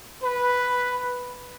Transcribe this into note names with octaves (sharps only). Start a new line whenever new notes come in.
B4